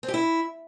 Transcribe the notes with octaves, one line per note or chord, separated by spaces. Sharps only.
C4
G4
E4